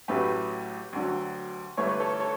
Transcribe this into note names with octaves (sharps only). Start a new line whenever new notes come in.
A1 A2 F#3 A3 G4 B4
D2 D3 F#3
G1 G2 E3 A3 C#5
B4
A4 C#5
A4 C#5